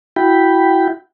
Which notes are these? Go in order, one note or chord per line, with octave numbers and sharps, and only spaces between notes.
E4 F#4 G5 B5